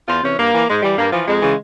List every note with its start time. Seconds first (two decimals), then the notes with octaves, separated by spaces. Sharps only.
0.08 E2 F4
0.23 C3 E3 C#4
0.38 G2 A#3
0.53 E3
0.67 G#2 G#3
0.82 E3 G3
0.97 G2 A#3
1.12 E3 F3
1.28 F2 G#3
1.41 C#3 E3